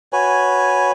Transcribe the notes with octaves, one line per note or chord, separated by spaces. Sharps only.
F#4 B4 C#5 G#5